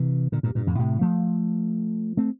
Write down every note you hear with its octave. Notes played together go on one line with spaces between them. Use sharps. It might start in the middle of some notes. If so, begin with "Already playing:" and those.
Already playing: C3 E3
A#2 D3
G2 A#2
G2 A#2
F2 A2
A2 C3
F3 A3
A3 C4